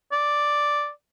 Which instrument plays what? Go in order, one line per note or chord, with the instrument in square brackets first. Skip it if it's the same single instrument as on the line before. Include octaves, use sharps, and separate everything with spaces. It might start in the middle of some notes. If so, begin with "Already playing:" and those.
[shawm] D5